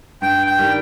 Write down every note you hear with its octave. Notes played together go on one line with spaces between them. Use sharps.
G2 G5
G5
D#3 G3